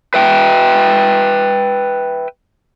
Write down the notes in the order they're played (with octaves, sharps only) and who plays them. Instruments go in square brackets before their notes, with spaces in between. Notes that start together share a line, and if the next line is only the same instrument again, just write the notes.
[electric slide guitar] B4 E5 G5